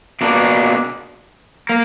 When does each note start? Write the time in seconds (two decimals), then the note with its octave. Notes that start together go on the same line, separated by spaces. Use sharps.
0.21 B2 A#3 D4
1.69 A#3